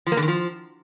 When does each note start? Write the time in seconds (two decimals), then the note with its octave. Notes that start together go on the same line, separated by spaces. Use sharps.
0.07 F3
0.12 A#3
0.17 D3
0.22 D#3
0.28 F3